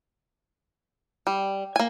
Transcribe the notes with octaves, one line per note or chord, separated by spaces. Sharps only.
G3
A#3 G#5